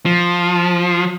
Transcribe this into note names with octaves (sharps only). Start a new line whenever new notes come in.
F3